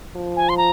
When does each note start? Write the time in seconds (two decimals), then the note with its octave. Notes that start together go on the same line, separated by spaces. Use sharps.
0.16 F3
0.37 G#5
0.49 C6
0.57 A#5